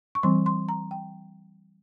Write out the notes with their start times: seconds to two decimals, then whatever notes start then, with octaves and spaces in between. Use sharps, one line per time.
0.15 C#6
0.23 E3 G3 C4 C6
0.46 C6
0.69 A#5
0.91 G5